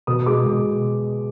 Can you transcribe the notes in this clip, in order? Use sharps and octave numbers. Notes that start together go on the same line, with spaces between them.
B2 D#6
G#3 D6
B2